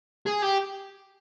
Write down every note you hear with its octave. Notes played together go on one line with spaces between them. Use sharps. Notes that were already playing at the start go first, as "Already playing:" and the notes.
G#4
G4